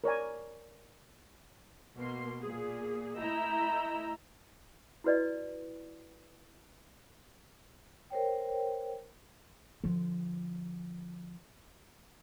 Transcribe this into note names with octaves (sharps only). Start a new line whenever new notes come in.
A#4 C#5 D5 G#5
B2 A#3 C6
A#2 G#4
A3 E4 D#5 A#5 E6 G6
E4 F#4 B4 D5 D#5
A#4 C5 C#5 G5
D3 F3